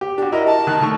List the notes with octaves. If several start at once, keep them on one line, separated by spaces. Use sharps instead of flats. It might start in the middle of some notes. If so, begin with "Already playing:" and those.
G4
D4 F#4 G4
E4 F#4 A#4 D#5
A5
D#3 F#6
D#3 A3 C#6